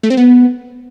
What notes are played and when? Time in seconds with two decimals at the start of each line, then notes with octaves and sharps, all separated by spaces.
0.03 A3
0.10 C4
0.17 B3